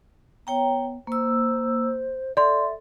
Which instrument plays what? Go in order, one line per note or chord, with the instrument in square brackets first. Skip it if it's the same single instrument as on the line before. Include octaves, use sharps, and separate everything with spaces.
[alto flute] B3 [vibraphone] C#5 G5 A#5
[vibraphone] A#3 E6 [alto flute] C5
[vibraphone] A4 [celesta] D5 C6 [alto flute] E5